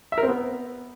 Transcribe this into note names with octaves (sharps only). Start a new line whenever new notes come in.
E5
A#4
C4
B3